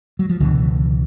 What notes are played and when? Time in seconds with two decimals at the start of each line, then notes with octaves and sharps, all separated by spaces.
0.19 F#3
0.29 F3
0.40 C#2 B2 D3 E3